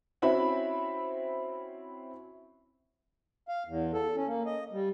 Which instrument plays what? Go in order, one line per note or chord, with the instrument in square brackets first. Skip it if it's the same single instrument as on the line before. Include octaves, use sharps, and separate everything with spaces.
[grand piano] C4 C#4 E4 F#4 E5 B5
[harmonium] F5
E2
A4
C#4
A#3
D#5
G3